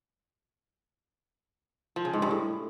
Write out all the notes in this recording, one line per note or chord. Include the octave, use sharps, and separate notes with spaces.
F3
C#3
G#2
G2
A2